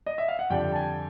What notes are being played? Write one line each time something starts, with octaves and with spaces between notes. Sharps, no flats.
D#5
E5
F5
F#5
F2 D3 G3 G5
A5
G#5